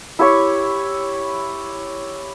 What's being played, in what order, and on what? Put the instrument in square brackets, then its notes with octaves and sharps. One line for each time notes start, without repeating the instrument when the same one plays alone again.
[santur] E4 G4 C#5 C#6